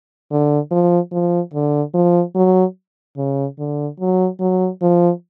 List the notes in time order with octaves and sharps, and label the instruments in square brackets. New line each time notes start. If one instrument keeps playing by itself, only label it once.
[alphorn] D3
F3
F3
D3
F3
F#3
C#3
D3
F#3
F#3
F3